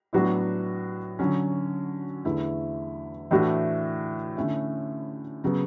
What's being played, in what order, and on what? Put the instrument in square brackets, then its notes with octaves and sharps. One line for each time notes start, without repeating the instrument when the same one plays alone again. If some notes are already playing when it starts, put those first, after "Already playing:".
[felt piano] A2 F#3 B3 D4 F#4
D3 F#3 C#4
E2 D3 A3 E4
A2 E3 A3 D4 F#4
D3 A3 C#4 E4
C#3 F#3 B3